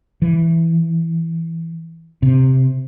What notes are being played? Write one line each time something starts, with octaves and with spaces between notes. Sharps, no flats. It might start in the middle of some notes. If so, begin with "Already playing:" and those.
E3
C3